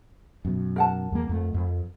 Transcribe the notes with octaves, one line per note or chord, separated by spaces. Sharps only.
F#2 B2
A#4 F#5 A5
E2 G3 A#3
F2 A3
F2